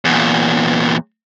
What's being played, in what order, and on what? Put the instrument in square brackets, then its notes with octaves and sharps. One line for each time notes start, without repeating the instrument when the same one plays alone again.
[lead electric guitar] E2 A#2